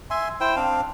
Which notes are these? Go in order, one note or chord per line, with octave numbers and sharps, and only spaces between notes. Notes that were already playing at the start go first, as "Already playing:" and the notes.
E5 G#5 C6
E4 C5 G5
C4 D4 F5